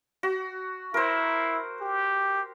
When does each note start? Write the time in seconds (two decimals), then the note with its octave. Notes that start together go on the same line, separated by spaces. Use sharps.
0.23 F#4
0.94 E4 A#4 C5
1.81 G4